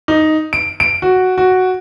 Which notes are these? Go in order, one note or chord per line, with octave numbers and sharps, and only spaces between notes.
D#4
D7
D7
F#4
F#4